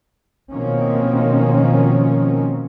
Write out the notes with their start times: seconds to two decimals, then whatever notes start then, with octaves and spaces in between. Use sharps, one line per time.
0.52 B2 D#3 F3 A#3 C4 C#4